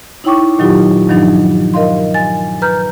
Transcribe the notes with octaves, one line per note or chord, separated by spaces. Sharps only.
D#4 E4 C#5 G5 C#6 D6
A#2 D#3 F#3 D#4 F4 G4
G2 D#3 F3 F#3 D4 D#4
A#4 D#5 F5 C6
G#5 A6
B4 A#5 F6 G6